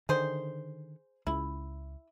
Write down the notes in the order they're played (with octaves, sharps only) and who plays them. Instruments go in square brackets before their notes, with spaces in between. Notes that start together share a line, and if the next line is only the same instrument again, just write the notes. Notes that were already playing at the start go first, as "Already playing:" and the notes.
[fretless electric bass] D3 D#3 [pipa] G#4 C5
[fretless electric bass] C#2 [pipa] E4